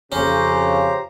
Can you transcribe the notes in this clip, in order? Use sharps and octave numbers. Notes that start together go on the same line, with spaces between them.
F2 C#3 C#4 G4 C5 A#5